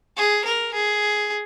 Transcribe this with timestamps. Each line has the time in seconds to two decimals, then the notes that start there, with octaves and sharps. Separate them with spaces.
0.17 G#4
0.44 A#4
0.73 G#4